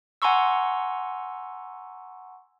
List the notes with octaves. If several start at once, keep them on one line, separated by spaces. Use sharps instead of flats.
F#5 G#5 A#5 C6 C#6 E6